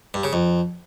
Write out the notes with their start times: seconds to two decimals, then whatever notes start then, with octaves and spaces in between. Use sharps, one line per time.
0.14 G2
0.24 C#3
0.33 F2